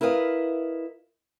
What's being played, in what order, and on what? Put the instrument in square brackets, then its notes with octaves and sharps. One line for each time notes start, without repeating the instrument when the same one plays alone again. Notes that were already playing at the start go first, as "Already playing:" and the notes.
[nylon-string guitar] E4 A#4 B4 D#5 F5